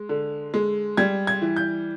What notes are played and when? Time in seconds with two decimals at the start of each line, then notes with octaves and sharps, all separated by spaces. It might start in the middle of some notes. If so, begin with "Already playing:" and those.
Already playing: G#3
0.09 D3
0.54 G#3
0.97 G3 G#6
1.27 G#6
1.42 E3
1.56 G6